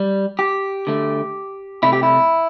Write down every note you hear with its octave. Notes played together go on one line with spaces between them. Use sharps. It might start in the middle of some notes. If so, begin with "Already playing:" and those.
Already playing: G3
G4
D3 A3
C3 A3 E4
G4
E4